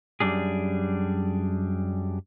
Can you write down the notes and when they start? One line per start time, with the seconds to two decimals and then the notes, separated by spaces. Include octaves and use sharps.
0.20 F#2 G3 D4 G#4